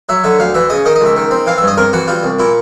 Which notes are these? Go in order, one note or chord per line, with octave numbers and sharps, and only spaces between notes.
F#3 E5
D3 E5
D2 F5
E3 E5
C#3 D#5
D#3 D#5
D#5
C#2 E5
D#3
C4
E3 F5
E5
G2
D#5
C3 A#4
E3 F#4
G3 F4
C2
A#2 E4